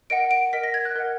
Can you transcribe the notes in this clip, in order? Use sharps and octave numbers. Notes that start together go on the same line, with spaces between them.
A#4 D#5 F#5 D7
D7
A#4 D#5 F#5 B6
A#6
G#6
F#6
A#4 D#5 F#5